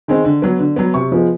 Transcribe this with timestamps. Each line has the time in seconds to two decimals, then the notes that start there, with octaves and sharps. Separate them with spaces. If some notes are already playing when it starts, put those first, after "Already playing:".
0.08 D#3 G#3 C4
0.24 D3
0.42 F#3 B3
0.59 D3
0.76 F#3 B3
0.94 C3 C#6
1.12 F3 G#3 B3